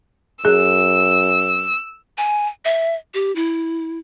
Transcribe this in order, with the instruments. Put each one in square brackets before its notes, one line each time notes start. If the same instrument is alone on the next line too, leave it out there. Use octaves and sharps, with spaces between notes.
[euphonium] F#2 [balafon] G#4 [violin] E6
[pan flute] G#5
E5
G4
E4